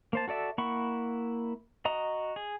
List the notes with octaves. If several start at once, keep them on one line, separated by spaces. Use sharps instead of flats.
A#3 C5 A5
F#4 A4 D5 E5
A#3 E4 F#5 B5 C#6
F#4 D#5 A#5 D#6
G#4